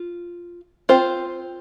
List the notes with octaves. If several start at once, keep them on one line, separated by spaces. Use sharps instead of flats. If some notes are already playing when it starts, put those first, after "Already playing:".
Already playing: F4
C4 F4 C5